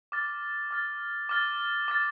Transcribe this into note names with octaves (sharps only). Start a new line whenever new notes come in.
D6 F6 A6
D6 F6 A6
D6 F6 A6
D6 F6 A6